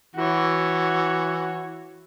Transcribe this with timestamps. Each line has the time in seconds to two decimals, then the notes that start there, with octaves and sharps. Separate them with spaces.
0.15 E3 F#4 C#5